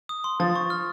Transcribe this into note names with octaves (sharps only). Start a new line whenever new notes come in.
D#6
C6
F3 A6
C#6
F6